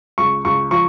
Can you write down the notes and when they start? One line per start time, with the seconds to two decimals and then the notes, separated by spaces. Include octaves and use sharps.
0.18 C#2 C#6
0.45 C#2 C#6
0.71 F3 C#6